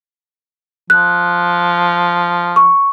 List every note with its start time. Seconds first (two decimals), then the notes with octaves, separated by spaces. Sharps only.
0.90 F3 F#6
2.56 C#6